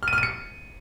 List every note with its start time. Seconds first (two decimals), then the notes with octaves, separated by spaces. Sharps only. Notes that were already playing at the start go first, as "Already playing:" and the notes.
0.03 F6
0.08 D#7
0.13 F6
0.18 D#7
0.23 C#7